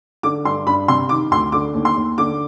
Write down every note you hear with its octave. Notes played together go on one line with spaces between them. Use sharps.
D3 D6
G2 C6
G2 B5
C3 C6
D#3 D6
D2 C6
D3 D6
D#2
C6
D#2
D3 D6